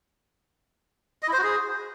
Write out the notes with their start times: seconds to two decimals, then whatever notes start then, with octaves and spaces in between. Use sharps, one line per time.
1.23 D#5
1.28 E4
1.33 C5
1.38 F#4
1.43 G#4